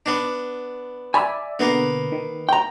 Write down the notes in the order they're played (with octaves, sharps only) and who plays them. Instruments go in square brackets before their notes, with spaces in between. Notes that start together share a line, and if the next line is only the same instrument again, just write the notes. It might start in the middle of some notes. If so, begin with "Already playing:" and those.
[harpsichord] B3 D4
[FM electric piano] D5 E5 [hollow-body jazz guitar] G#5 B5
[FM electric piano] B2 D3 [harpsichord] A#3 B3
[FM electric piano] D#3
[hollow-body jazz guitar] G5 A#5